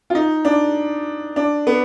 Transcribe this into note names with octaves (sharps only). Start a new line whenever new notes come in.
F4
D#4
D4
D4
B3